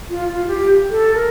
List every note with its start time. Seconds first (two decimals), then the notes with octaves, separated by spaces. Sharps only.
0.09 F4
0.28 F4
0.47 G4
0.91 A4
1.15 A#4